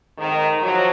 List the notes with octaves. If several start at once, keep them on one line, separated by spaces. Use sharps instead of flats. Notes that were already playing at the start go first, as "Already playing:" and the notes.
F2 G#2 D#3
F3 F#3